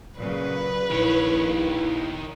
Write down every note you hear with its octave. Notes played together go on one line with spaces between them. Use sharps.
A#2 C#3 F#3 B4
A#1 D#3 E4 C#5